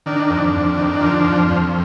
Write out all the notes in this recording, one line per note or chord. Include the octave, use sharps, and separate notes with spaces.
D#3 D4
F2
F2
D#3
F3
F2
F2